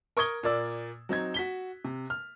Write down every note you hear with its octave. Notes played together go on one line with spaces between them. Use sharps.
A#4 C#6 D#6 G#6 G7
A#2 A#3 D5 E6
F#3 C4 D#4 G#6
F#4 B6 G7
C3
F6